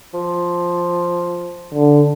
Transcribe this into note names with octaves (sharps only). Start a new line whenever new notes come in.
F3
D3